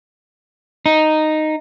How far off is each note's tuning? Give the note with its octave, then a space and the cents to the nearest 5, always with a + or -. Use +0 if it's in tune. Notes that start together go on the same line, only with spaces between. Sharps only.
D#4 -5